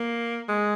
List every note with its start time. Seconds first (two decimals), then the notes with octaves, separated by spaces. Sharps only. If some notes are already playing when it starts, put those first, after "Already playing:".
Already playing: A#3
0.49 G#3